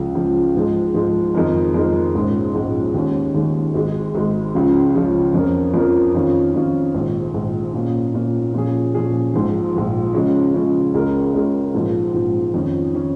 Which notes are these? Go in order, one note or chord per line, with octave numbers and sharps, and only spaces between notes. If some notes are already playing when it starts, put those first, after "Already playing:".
Already playing: C#2 C#3 F3
C#2 C#3 F3
G#2 F3 G#3
G#2 F3 G#3
F2 D#3 G#3 D#4 A#4
F2 D#3 G#3 D#4 A#4
A#1 G#2 G#3 C#4
A#1 G#2 G#3 C#4
D#2 D#3 G#3 C#4
D#2 D#3 G#3 C#4
G#1 G#2 G#3
G#1 G#2 G#3
C#2 C#3 F3 C#4
C#2 C#3 F3 C#4
F2 F3 C#4 A#4
F2 F3 C#4 A#4
F2 D#3 C#4 F4
F2 D#3 C#4 F4
A#1 G#2 D#3
A#1 G#2 D#3
A#2 A#3 C#4
A#2 A#3 C#4
A#2 F3 C#4 G#4
A#2 F3 C#4 G#4
A#1 G#2 F3
A#1 G#2 F3
C#3 F3 G#3 C#4
C#3 F3 G#3 C#4
C#2 C#3 G#3 C#4 A#4
C#2 C#3 G#3 C#4 A#4
A#1 G#2 F3
A#1 G#2 F3
F2 D#3 C#4
D#3 C#4